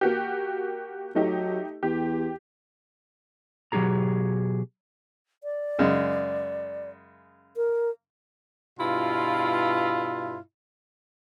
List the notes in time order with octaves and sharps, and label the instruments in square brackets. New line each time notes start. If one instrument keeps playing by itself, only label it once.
[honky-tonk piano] A#3 F#4 G4
[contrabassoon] F#3 [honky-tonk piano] A3 D#4 G4
[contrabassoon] E2 [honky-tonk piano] G4
[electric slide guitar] B2 F#3 A#3 G4 G#4 A#5
[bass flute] D5
[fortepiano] F#2 C#3 G#3
[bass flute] A#4
[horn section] G2 B2 E4 F4